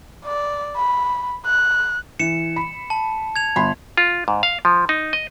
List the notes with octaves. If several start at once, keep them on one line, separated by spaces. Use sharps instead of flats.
D5
B5
F#6
E3 C#7 E7
B5
A5
G#6 F7
G1 B5 C6
F4
G#2
F5
F3
D#4
D#5